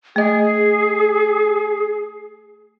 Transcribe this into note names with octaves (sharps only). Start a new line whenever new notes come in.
A3 G#4 D#5